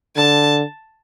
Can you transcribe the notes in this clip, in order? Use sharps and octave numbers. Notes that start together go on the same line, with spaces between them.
D3 A5